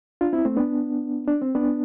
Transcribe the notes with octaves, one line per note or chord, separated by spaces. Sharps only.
D4 F4
C4 E4
A3 C4
B3 D4
D4
C4
B3 D4